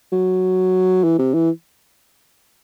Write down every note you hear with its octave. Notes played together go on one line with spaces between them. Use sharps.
F#3
E3
C3
E3